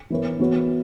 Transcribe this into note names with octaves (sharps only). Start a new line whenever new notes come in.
E3 B3 E4 A#4 C#5
E3 B3 F#4 C#5